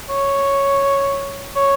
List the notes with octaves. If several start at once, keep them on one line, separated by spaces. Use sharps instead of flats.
C#5
C#5